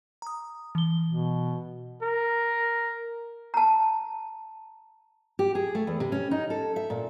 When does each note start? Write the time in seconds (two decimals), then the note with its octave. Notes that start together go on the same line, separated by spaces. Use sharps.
0.22 A#5 D#6
0.75 E3 G7
1.08 B2
2.02 A#4
3.54 A5 A#5
5.39 G4
5.55 G#4
5.75 A3
5.87 E2
6.00 C3
6.12 C#4
6.31 D#4
6.50 A4
6.76 E5
6.90 A#2